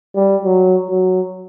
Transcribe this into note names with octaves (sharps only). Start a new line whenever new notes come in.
G3
F#3
F#3